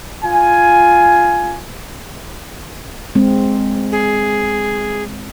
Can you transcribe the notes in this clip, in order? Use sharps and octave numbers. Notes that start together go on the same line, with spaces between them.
F4 G#5
G#3 C4
G#4